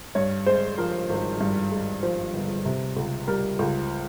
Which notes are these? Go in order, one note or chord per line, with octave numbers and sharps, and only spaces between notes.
G2 C#5
G#3 C5
F3 A#4
G#1
G2
G#3
F3 C5
G1
C3
C#2
G3 A#4
C#2